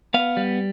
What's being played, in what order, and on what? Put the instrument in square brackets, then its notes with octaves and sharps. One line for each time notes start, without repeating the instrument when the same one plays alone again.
[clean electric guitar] B3 F5
G3